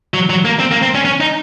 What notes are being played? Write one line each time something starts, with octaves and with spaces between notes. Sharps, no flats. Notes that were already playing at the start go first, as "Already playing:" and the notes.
F#3
F#3
A#3
C4
A#3
C4
C#4
C#4
D#4